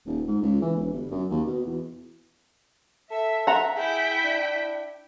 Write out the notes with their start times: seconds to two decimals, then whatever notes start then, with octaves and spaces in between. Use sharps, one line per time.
0.06 D#1
0.27 G#2
0.42 C#2
0.61 E3
0.76 E1
0.92 G1
1.10 F#2
1.30 D#2
1.47 B2
1.66 E2
3.11 A4 E5
3.47 E5 F#5 A#5
3.76 E4 G#4 G5 B6
4.23 D4